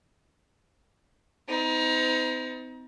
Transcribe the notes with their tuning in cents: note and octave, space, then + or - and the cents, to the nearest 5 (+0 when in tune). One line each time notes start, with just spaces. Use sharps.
C4 -40 D#4 +25